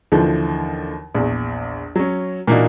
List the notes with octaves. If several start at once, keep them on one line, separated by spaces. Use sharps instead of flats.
D#2 D3 E3 F3
A#1 E2
F#3 C#4
A#2 E3 A#3 D4 D#4 F#4